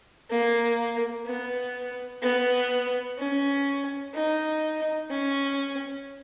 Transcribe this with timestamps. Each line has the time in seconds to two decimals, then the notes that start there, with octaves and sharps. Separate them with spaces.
0.30 A#3
1.26 B3
2.22 B3
3.18 C#4
4.14 D#4
5.10 C#4